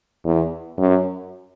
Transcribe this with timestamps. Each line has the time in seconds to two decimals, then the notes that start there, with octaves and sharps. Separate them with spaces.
0.25 E2
0.78 F#2